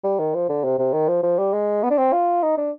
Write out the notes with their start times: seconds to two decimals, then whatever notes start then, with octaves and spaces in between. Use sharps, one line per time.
0.04 G3
0.19 D#3
0.34 F3
0.49 D3
0.64 C3
0.79 C3
0.94 D#3
1.08 F3
1.23 F3
1.39 G3
1.53 G#3
1.83 B3
1.91 D4
1.98 C4
2.13 F4
2.43 D#4
2.58 D4